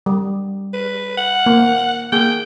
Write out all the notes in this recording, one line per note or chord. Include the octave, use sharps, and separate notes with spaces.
G3
B4
F#5
A#3
A#3 G#4 G5